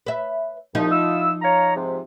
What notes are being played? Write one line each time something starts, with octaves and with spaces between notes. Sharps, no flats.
B4 E5
C2 F3 D#4
E4 F4 E6
C#5 F5 A#5
G#2 C3